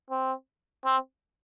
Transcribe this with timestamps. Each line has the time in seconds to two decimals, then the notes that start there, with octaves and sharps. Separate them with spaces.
0.10 C4
0.86 C4